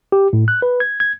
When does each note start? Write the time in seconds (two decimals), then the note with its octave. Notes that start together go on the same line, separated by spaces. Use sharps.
0.12 G4
0.33 A2
0.48 F#6
0.62 B4
0.80 G#6
1.00 G#6